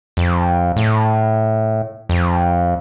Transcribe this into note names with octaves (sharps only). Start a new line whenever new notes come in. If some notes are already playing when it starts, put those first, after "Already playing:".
F2
A2
F2